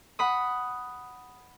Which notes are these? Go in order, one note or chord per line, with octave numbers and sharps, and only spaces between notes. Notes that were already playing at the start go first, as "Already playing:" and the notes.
F#5 B5 D#6